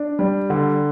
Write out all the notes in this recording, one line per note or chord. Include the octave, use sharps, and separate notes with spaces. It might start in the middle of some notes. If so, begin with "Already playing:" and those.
Already playing: D4
G3
D3